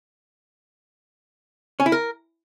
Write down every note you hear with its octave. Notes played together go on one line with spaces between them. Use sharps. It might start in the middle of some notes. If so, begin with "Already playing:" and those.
C#4
E4
A#4